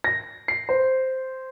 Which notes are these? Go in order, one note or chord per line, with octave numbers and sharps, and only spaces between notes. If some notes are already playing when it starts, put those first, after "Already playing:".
A#6
C7
C5